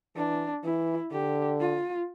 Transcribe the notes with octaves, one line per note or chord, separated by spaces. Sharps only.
E3 D4
E3 E4
D3 G4
F4